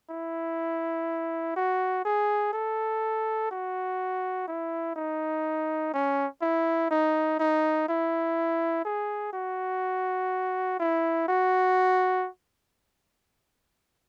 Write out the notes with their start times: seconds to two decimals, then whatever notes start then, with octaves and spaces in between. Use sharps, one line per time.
0.10 E4
1.56 F#4
2.05 G#4
2.53 A4
3.51 F#4
4.48 E4
4.96 D#4
5.93 C#4
6.42 E4
6.91 D#4
7.40 D#4
7.88 E4
8.85 G#4
9.33 F#4
10.80 E4
11.28 F#4